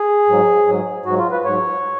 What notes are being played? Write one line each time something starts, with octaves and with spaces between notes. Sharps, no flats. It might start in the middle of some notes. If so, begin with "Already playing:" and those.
Already playing: G#4
G#2 F#3
G#2 F#3
G#2 F#3 F#4
F4
B4
G#2 F#3 C#5